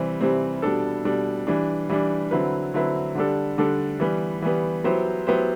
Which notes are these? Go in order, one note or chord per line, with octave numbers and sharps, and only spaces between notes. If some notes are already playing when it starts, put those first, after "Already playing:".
Already playing: C3 E3 G3 C4
C3 E3 G3 C4
B2 G3 D4 A4
B2 G3 D4 A4
E3 G3 D4
E3 G3 D4
D3 F#3 C4 E4 B4
D3 F#3 C4 E4 B4
D3 G3 D4 A4
D3 G3 D4 A4
E3 G3 B3
E3 G3 B3
F#3 B3 E4 G4 C5
F#3 B3 E4 G4 C5